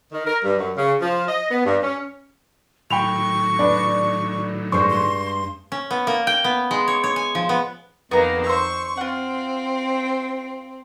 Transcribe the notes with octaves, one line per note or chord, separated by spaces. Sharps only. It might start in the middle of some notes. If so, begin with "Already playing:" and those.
D#3
A#4
G2
F#2
C#3
F3
D#5
B3
G2
C#4
A2 D#3 F#3 G5 B5 C#6 F7
D4 B4 D5
G2 G#3 C5 C#6
C6
C#4
B3
A#3
G5
B3
G#3
C#5
C#5
G#5
F3
B3
F2 D#3 A#3 B3 G#4 A#5
C5 C#6 E6
C4 F4 F#5